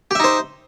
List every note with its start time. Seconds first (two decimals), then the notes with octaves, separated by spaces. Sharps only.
0.11 G4
0.15 E5
0.20 D#4
0.24 C5